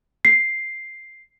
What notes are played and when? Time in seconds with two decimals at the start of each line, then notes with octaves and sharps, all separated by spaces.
0.25 C7